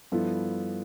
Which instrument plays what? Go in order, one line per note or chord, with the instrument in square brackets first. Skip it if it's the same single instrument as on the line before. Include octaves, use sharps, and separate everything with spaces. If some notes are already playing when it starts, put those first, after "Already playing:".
[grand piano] G2 F3 B3 E4 A4